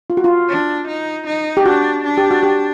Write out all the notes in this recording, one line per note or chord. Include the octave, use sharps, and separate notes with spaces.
F4
F#4
F4
D4
D#4
D#4
G4
D4 F#4
D4
G4
F#4
G4